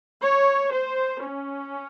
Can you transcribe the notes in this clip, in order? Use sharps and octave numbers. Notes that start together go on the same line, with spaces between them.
C#5
C5
C#4